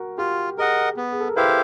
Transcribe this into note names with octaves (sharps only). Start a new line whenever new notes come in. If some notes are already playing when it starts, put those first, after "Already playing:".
Already playing: F#4 A#4
F4 G4
G#4 A#4 D#5 F#5
B3
G#4
A4
A#4
E4 G4 B4 C5 F5